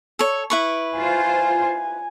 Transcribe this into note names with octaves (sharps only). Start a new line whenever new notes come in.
A4 C#5
E4 B4 C#6
F4 C5 G#5